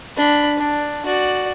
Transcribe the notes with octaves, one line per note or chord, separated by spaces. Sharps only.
D4 B5
D4
F#4 D5